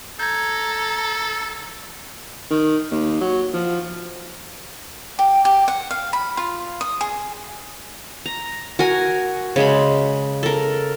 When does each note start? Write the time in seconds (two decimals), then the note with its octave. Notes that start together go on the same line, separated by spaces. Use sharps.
0.19 A4 A#5 G6 G#6
2.51 D#3
2.91 D#2
3.21 F#3
3.54 F3
5.19 G4
5.45 G4
5.68 F#5
5.91 F5
6.13 B5
6.37 F4
6.81 D#6
7.01 G#4
8.26 A#5
8.79 F#4 A#4 G#5
9.56 C#3 G#3 B5
10.43 A4 A#4